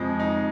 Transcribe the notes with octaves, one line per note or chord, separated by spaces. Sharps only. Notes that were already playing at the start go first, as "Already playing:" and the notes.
Already playing: F2 C3 F3 G#3 G#4
D#4